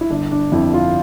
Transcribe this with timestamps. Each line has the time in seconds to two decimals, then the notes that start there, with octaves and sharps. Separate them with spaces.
0.01 E4
0.10 G1 D4
0.31 D4
0.52 F2 E4
0.74 F4